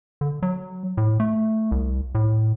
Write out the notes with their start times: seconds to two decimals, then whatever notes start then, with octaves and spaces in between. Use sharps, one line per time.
0.21 D3
0.43 F#3
0.97 A2
1.20 A3
1.72 C2
2.15 A2